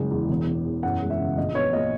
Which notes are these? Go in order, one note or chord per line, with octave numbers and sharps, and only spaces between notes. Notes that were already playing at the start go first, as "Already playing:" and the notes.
Already playing: F#1 G#3
E2
E1
E1
E2
F#2 F#5
G#3
E5
C#3
A#1 D#5
B3 C#5
A#2 D#5